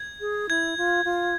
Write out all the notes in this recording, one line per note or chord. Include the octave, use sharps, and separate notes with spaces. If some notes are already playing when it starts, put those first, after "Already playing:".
Already playing: G#6
G#4
E4 G#6
F4
F4